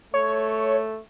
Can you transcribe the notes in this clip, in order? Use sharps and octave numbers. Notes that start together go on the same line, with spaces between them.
A3 C#5